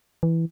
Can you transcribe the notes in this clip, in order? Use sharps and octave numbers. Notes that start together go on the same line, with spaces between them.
E3